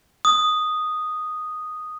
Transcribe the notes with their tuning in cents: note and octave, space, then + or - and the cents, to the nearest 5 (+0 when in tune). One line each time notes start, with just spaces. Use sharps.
D#6 -5